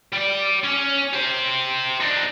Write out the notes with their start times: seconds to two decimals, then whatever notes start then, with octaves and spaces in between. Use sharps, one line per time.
0.13 G3 D5
0.64 C#4
1.13 G4 C5
2.00 D4 D#4